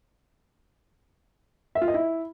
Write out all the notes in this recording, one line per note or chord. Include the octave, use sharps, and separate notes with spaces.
E5
F4
D#5
E4